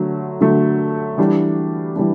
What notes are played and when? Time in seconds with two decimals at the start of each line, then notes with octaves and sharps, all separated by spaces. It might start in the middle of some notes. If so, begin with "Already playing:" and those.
Already playing: D3 F#3 A3
0.41 D3 F#3 A3
1.18 E3 G3 D4
1.96 E3 G3 D4